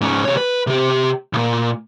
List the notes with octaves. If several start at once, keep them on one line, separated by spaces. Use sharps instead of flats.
G#2 C#4
C3 C#5
B4
C3 G4
B1 A#2